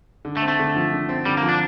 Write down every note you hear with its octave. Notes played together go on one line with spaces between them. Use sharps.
D3
A3
C4
A3
D3
F3
D3
C4
D3 G3
A#3
F3
D4